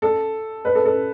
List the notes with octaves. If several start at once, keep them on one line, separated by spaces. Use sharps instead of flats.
A4
B4
A4
A4